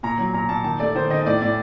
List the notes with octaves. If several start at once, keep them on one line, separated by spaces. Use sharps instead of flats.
A#2 A#5
F#3
A#2 A#5
A#2 A5
D#3 A5
A3 D5
D#3 C5
D#3 D#5
D#5
A2 D5
A2 D5